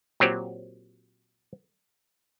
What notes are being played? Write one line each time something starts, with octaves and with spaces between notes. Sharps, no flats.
A#2 F#3 C4 G4